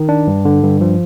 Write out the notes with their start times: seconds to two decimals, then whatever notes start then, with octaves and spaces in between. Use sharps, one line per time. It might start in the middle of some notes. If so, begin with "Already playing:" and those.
Already playing: D#3
0.09 D4
0.27 G2
0.45 D3
0.63 G2
0.81 F3